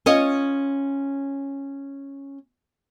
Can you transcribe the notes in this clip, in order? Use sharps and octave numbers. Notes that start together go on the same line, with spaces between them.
C#4 F4 C#5 D#5